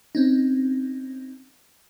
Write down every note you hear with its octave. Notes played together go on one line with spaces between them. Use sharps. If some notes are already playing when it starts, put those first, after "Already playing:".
C4 C#4 D#4